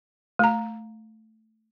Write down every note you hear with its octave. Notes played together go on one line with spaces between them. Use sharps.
A3 A#5